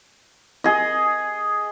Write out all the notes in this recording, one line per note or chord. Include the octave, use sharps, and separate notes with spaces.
G#4 D#5